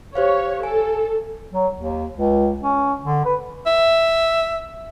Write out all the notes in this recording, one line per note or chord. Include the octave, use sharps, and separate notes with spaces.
G4 C5 C#5 F5
A4 G#5
F#3
D#2
C#2
C#4
D3
B4
E5